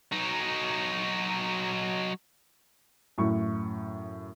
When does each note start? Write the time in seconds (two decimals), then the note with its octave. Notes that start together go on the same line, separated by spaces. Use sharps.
0.12 F#3 D#4
3.18 F#2 A2 C#6